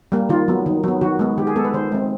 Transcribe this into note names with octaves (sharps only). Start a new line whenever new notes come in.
G3 A#3
D#3 F4
F#3 B3
D#3
F#3 B3
D#3 F#4
G#3 B3
D#3 G4
G#4
G#3 B3 A4
B4
D#3 C5
G#3 C4